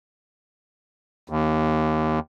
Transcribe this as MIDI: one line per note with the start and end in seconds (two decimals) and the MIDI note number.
1.30 2.19 39